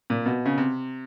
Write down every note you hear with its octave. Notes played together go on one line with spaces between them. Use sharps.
A#2
B2
C#3
C3